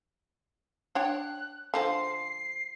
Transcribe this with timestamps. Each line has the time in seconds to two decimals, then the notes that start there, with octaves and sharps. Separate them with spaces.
0.95 D4 C#5 G5 F#6
1.74 D3 F3 C5 C7